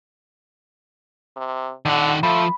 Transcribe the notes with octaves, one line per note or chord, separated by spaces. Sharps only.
C3
D3 D#3 F#5
F3 A3 B5